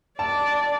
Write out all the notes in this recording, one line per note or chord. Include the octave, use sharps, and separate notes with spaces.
D5 A5